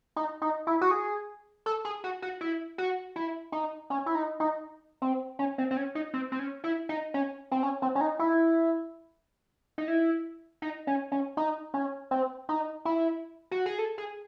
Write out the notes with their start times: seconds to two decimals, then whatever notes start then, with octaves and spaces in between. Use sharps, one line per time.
0.16 D#4
0.42 D#4
0.67 E4
0.81 F#4
0.91 G#4
1.66 A4
1.85 G#4
2.04 F#4
2.22 F#4
2.41 E4
2.78 F#4
3.16 E4
3.52 D#4
3.90 C#4
4.06 E4
4.15 D#4
4.40 D#4
5.02 C4
5.39 C#4
5.58 C4
5.71 C4
5.77 C#4
5.95 D#4
6.14 C4
6.32 C4
6.39 C#4
6.64 E4
6.89 D#4
7.14 C#4
7.52 C4
7.63 C#4
7.82 C4
7.95 C#4
8.01 D#4
8.19 E4
9.78 D#4
9.88 E4
10.62 D#4
10.87 C#4
11.12 C#4
11.37 D#4
11.74 C#4
12.11 C4
12.49 D#4
12.85 E4
13.51 F#4
13.66 G#4
13.79 A4
13.98 G#4